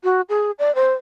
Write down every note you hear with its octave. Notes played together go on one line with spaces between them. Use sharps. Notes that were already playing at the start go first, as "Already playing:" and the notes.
F#4
G#4
D5
C5